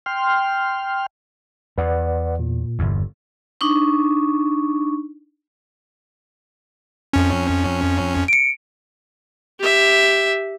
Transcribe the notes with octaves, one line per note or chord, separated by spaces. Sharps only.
G5 C6 F6
E2 B4 D5 F#5
A#2
G1 E2
D4 D#4 C#6
F2 C#4
C#7 D7
G4 E5